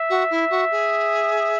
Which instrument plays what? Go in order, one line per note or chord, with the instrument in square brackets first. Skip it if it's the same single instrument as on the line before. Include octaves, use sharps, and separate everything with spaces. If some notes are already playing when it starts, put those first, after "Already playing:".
Already playing: [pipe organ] E5
[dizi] F#4
E4
F#4
G#4